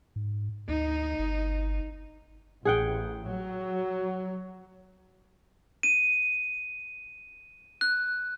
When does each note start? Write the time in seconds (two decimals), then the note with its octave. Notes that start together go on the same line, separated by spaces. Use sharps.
0.16 G#2
0.69 D2 D#4
1.19 G1
2.65 A1 G#4 F#5 G5
3.29 F#3
5.83 D#7
7.81 F#6